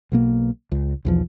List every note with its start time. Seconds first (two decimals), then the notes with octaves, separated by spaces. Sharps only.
0.12 B1 B2 A#3
0.72 C#2
1.05 B1 E2 F3